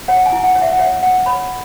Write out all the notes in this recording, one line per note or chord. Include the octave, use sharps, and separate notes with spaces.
C#5 F#5
G#5
E4
F#5
C#5
E5
F#5
C#5 E5
C#5 F#5
C#5 B5